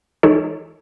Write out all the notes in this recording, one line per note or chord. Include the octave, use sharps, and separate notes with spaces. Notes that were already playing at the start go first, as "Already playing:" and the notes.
E3 G#3 D#4 A4 C#5